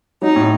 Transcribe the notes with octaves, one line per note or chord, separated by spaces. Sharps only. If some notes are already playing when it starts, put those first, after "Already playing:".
F#3 D#4
A2